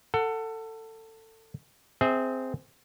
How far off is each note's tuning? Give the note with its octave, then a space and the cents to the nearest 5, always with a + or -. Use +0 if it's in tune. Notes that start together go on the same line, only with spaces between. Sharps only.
A4 +20 F#5 +0
C4 -10 G#4 +5 E5 -30